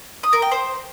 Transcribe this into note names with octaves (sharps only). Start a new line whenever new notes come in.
D#6
A#4
G5
C5